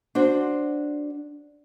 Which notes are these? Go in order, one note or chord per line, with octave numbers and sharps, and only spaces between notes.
D4 F#4 C5